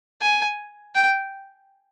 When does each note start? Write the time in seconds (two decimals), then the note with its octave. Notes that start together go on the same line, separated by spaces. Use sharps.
0.22 G#5
0.95 G5